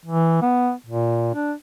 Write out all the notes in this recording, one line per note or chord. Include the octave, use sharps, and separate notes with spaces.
E3
B3
A#2
D4